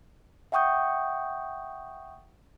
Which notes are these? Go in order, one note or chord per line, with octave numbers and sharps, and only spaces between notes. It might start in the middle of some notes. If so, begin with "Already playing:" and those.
E5 F#5 G5 C#6 D#6 G6